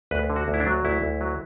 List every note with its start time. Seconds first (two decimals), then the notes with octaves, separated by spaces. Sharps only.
0.11 D2 B4
0.30 D3
0.36 F#4
0.48 D2
0.54 E4
0.60 D4
0.66 F#3
0.84 D2 E4
1.02 D2
1.21 F#3